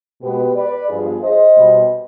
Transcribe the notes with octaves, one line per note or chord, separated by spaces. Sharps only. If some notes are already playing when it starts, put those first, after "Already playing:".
B2 G#3 B3 G4 B4
B4 D5
G2 F3 B3 F4 G#4
C5 D#5
B2 G3 B3